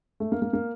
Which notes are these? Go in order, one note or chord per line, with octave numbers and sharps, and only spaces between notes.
A3
A#3
A#3
A#3